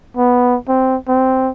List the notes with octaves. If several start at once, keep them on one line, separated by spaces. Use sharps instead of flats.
B3
C4
C4